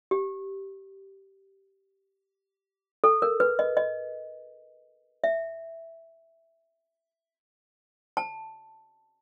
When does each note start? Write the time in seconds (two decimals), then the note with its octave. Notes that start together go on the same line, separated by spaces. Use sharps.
0.11 G4
3.04 A4
3.22 A#4
3.40 B4
3.59 D#5
3.77 D#5
5.24 E5
8.17 A5